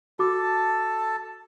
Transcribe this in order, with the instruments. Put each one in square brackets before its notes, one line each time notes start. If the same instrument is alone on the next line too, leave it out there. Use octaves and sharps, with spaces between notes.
[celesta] F#4 D6 [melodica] A4 A5